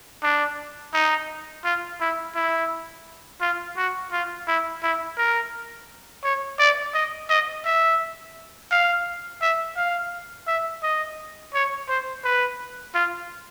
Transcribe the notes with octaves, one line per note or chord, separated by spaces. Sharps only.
D4
D#4
F4
E4
E4
F4
F#4
F4
E4
E4
A#4
C#5
D5
D#5
D#5
E5
F5
E5
F5
E5
D#5
C#5
C5
B4
F4